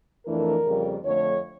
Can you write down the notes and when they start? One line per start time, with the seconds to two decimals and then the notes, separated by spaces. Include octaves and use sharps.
0.26 F2 E3 A3 D4 A#4
0.65 F2 C#3 G3 A#3
1.04 F2 D3 A3 C#5